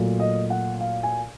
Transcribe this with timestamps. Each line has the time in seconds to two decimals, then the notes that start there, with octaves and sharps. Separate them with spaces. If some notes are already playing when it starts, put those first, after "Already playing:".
Already playing: A#2 F#3 A3
0.20 D#5
0.50 F#5
0.80 F5
1.03 G#5